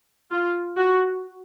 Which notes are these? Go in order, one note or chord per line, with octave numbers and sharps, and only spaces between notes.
F4
F#4